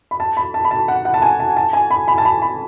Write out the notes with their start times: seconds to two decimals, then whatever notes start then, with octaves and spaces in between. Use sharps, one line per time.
0.11 B5
0.20 A5
0.37 B5
0.54 A5
0.65 B5
0.71 A5
0.88 F#5
1.05 F#5
1.14 A5
1.22 G#5
1.40 A5
1.57 A5
1.73 G#5
1.91 B5
2.08 B5
2.18 A5
2.25 B5
2.42 B5